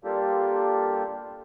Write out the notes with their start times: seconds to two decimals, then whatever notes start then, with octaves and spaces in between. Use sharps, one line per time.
0.04 G3 A#3 D4 F4 G4 A4